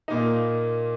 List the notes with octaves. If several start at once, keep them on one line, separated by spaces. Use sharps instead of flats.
A#2 A#3 D#4